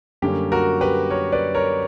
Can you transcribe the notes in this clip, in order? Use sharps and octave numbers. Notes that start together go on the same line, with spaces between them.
F#2 D3 G3 A#3 C#4 G4
F#4 A#4
G4 B4
A#4 C#5
B4 D5
A#4 C#5